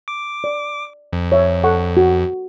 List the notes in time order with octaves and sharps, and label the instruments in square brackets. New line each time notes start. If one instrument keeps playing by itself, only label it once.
[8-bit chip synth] D6
[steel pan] D5
[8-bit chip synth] F2
[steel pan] C#5 E5
A4 F#5 C#6
F#4